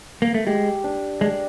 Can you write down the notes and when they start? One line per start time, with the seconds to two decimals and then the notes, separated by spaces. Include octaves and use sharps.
0.22 A#3
0.34 A3
0.47 G#3 G4
0.84 D4
1.21 G#3 D4